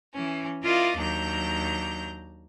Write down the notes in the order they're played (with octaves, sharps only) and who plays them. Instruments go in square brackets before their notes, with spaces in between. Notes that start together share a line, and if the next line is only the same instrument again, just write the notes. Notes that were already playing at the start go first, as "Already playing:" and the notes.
[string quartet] E3 C#4
E4 F4 A#4 D5 D#5 F5
D#2 F#3 D4 A#5 G6